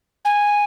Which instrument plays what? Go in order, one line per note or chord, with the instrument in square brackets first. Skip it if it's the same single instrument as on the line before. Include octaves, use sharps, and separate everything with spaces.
[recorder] G#5